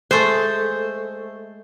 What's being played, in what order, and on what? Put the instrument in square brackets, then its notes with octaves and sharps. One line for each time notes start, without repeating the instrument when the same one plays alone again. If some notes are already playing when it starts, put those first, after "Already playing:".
[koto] G#3 A3 [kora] C5